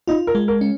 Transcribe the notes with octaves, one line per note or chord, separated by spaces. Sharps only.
D#4 F4
A#4
G#3
A#4
C#4